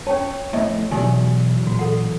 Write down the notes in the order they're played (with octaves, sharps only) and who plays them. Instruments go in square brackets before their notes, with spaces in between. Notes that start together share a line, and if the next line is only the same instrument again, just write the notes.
[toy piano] C#4 G5 A5 [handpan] C#5
[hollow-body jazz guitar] F2 A2 [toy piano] D#5 E5
[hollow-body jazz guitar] E2 F#3 [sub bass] B2 [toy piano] D#4 G4 G#5
[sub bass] A#2 [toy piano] F#4
[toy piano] A4 F#5